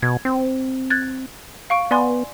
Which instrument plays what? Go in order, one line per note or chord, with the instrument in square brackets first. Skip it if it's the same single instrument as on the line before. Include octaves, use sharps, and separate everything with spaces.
[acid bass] B2 [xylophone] G#6
[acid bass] C4
[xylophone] F#6 G#6 A6
F5 C#6 D7
[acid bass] B3 [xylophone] D5 G#5 C6